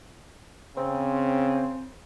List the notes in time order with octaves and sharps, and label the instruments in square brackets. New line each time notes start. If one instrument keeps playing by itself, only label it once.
[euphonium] C#3 [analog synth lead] C4